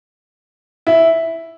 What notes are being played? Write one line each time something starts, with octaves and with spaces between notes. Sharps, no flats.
E4